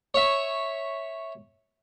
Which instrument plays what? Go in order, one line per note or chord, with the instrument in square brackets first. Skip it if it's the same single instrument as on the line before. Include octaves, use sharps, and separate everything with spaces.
[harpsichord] C#5 E5